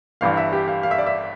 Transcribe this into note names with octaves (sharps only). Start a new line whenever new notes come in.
G1 G2 E3 F5
E5
G4
F5
F5
E5
D5
E5